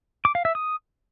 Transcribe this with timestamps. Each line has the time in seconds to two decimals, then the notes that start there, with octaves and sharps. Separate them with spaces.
0.25 D6
0.35 F5
0.45 E5
0.55 D#6